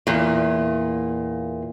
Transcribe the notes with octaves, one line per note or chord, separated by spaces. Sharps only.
E2 A#2